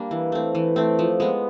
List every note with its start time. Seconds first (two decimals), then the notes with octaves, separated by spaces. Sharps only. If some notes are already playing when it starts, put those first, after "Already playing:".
Already playing: G3 A#3 D4
0.11 E3
0.32 A3 C4
0.55 E3
0.76 A3 C4
0.99 F3
1.20 G#3 B3